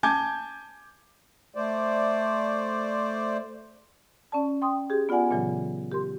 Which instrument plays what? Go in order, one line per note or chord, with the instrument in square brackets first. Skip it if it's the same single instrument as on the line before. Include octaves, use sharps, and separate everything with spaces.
[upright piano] G#5 A5 D6 G6 G#6
[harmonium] A3 C5 D5
[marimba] C#4 D5 A5
G5 C6 D#6
G4 G#4
B3 F4 D5 F#5 G#5
A#2 C#3 E3 F#3
G4 A#4 C6